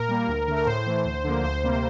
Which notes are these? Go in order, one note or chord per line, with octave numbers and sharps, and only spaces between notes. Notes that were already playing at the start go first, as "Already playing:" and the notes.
Already playing: A#2 A#4
G3 A#3
D2
D3 A3
A#4
A2 C5
E3 A3
D2
D3 F3 A#3
D2 C5
C3 G3 A#3